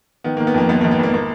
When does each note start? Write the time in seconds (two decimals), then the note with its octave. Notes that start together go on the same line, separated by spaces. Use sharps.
0.24 D#3 B3
0.37 A#3
0.40 D#3
0.47 B3
0.54 F2 A#3
0.69 G#1 B3
0.81 A#3
0.84 G#1
0.91 B3
0.99 G#1 A#3
1.14 A#3